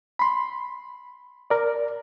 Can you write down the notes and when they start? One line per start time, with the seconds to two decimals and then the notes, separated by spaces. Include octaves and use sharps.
0.19 B5 C6
1.50 A#4 D5